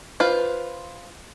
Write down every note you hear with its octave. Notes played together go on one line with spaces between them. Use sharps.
F4 B4 C5